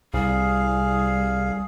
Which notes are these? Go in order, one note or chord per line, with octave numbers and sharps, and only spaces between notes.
C2 G3 G#4 F5